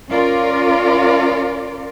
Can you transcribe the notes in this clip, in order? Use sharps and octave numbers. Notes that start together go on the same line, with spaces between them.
C#4 F4 A#4 D5